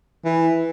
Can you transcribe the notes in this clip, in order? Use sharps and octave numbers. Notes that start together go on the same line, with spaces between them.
E3